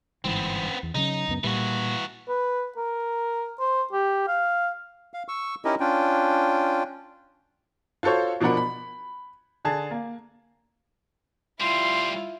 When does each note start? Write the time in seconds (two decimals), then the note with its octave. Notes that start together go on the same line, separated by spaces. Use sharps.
0.24 G1 G#2 E3 B3 C4
0.83 E2
0.95 C#3 F#3 C#4 D#4
1.28 C#2 F#2 B3
1.44 A#2 E3 G3 F#4
2.28 B4
2.77 A#4
3.60 C5
3.93 G4
4.28 F5
5.14 F5
5.28 C#6 E6
5.65 C#4 D#4 E4 G4 A#4 D#5
5.80 C#4 D4 F4 G5
8.03 F4 F#4 A4 C5 C#5
8.41 B2 F3 D4 A#4 F#5 B5
8.57 B5
9.65 D3 G#4 A5
9.91 A#3
11.60 D2 G3 E4 F4 C6